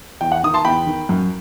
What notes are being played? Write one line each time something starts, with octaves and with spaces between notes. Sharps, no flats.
E2 G5
F#5
D#3 D#6
A5 C6
E2 G5 B5
D#3
F#2